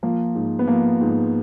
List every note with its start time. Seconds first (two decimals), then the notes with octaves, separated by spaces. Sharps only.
0.03 F3 A#3
0.35 G#2
0.59 B3
0.67 F3 A#3
1.01 G#2